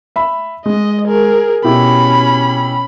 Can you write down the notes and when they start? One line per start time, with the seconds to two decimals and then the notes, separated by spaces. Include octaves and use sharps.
0.16 E5 B5
0.66 G#3 D#5
1.07 G#4 A#4
1.64 B2 C#4 E4 G4 B5